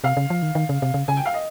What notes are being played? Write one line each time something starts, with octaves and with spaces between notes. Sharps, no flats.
C3 F5
C#3
F3
D#3
D#3
C#3
C3
C#3
C#3 G#5
G5
F5
D#5